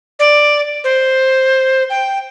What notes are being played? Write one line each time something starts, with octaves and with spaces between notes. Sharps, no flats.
D5
C5
G5